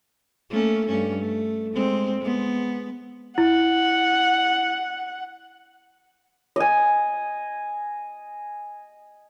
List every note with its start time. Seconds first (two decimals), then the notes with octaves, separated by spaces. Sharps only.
0.50 A3 A#3 C#4
0.88 G2 A3 C#4
1.19 A3
1.74 G#3 C4
2.21 G#3 B3
3.38 E4 F#5
6.56 D#5 G#5